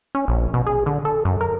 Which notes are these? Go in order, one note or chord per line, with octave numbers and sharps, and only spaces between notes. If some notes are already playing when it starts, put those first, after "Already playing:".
C#4
A#1
B2
G#4
D3
A4
F#2
A#4